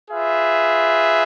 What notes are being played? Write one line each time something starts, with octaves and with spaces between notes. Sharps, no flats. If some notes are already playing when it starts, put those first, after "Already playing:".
F4 G#4 B4 E5